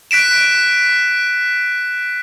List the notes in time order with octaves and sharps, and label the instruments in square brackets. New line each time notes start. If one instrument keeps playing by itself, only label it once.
[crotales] F#6 B6 D7 E7